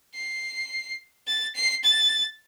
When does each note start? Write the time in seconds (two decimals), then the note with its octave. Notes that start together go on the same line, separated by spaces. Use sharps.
0.14 C7
1.27 A6
1.55 C7
1.83 A6